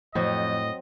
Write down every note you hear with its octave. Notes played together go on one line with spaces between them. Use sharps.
F2 A2 F#3 C4 D#5